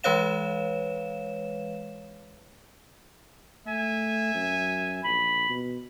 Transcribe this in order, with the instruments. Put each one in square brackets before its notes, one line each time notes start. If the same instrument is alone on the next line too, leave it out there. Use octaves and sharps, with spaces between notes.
[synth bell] E3 G#3 B4 C#5 F5 E7
[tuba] A3 [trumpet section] E5 G#5
[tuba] F#2
[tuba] A#1 [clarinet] B5
[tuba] B2